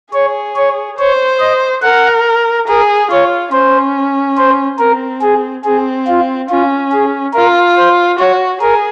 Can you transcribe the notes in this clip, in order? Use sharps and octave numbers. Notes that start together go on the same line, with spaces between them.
G#4 C#5
C#5
C5 C#5
D#5
A#4 F#5
G#4 A#4
F4 C#5
C#4 C5
C5
C4 A#4
G#4
C4 G#4
F4
C#4 F4
G#4
F4 A#4
C5
F#4 C#5
G#4 A#4